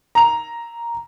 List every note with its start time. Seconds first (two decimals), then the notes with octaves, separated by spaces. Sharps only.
0.15 A#5 F7